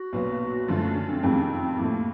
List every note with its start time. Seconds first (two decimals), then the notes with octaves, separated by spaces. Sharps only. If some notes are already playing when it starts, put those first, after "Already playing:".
Already playing: F#4
0.13 B1 A#2 F#3 B3
0.68 F#2 D3 F3 A3 F4
0.82 D4
0.96 C#4
1.10 C4
1.23 F2 C3 D#3 G#3 C4
1.51 C4
1.78 A2 F3 A3 A#3